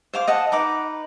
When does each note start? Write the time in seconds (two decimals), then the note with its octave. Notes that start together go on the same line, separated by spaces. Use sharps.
0.14 C5 F5 D6
0.28 D#5 F#5 A5
0.52 D#4 B4 D6